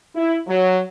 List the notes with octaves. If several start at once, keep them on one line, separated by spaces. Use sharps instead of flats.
E4
F#3